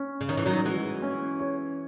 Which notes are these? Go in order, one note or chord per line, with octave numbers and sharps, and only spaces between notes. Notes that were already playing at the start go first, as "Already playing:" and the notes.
Already playing: C#4
C#3
D#3 C#5
E3
D#3 F#3
E3 G#3 F#4
C#4
C#5